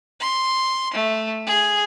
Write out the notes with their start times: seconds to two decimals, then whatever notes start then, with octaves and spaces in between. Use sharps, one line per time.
0.20 C6
0.94 A3
1.47 G#4